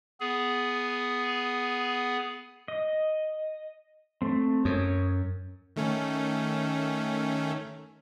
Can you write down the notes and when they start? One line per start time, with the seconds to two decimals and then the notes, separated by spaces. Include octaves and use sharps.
0.20 B3 G#4
2.68 D#5
4.22 A3 C4
4.65 F#2 C#5 D#6
5.76 D#3 A3 C#4